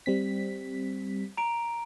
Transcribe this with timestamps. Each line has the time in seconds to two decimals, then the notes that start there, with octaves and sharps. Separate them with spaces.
0.06 G3 C4 B6
1.37 A#5 D7